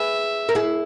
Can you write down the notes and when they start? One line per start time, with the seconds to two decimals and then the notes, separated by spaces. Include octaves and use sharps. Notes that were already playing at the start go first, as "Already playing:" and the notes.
Already playing: G#4 B4 E5
0.49 A#4
0.55 E4 G#4